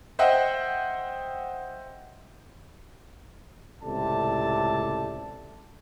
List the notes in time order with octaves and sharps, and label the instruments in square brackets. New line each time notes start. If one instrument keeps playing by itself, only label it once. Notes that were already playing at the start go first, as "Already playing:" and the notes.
[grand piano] C5 D#5 E5 F#5 G5
[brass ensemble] C#2 A2 C3 A4 D5 A5